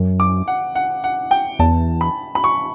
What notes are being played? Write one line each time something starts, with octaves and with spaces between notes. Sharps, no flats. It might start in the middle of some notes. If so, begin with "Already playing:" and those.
Already playing: F#2
D6
F#5
F#5
F#5
G5
E2 A5
B5
B5
C#6